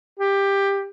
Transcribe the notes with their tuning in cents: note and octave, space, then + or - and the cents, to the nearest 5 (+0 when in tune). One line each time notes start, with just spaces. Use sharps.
G4 +15